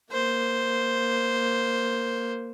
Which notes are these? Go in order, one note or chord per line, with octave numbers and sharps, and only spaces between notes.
A#3 C5